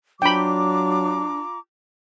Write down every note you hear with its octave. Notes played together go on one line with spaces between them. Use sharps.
F#3 D4 F4 G5 A#5 B5 D6